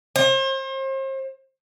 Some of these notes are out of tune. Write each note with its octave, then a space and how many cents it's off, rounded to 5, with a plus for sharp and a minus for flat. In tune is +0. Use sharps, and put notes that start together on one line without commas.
C5 +40